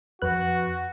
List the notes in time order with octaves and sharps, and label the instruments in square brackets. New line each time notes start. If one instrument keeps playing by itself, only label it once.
[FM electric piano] F2 B4 F#6 [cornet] F#4